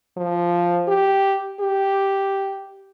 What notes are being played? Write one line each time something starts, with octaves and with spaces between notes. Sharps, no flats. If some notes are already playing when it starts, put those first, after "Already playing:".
F3
G4
G4